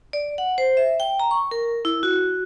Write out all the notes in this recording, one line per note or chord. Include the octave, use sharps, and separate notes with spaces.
D5
F#5
C5
E5
G5
A#5
C#6
A#4
E4
F#4